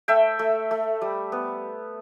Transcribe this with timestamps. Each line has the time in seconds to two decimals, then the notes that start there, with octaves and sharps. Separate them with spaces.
0.08 A3 E5 G5
0.39 A3
0.71 A3
1.01 G3
1.32 B3